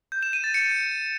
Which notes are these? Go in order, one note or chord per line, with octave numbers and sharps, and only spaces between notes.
G6
E7
D#7
A6
C#7